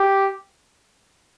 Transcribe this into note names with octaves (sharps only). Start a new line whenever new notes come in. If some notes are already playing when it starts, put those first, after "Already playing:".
Already playing: G4